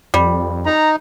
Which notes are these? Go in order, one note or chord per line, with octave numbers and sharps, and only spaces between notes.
F2 G3
D#4 A#5